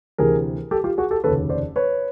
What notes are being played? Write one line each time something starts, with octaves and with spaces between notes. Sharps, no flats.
D2 C3 E3 G#4 A#4
G4 A4
F4 G4
F#4 G#4
G4 A4
F1 D#2 C#3 A4 B4
C5 D5
B4 C#5